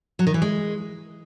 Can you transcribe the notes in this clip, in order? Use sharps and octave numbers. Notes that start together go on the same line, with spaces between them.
F#3
D#3
E3
G#3